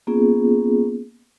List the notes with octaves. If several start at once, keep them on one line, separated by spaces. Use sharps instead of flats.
A#3 B3 C#4 F4 G#4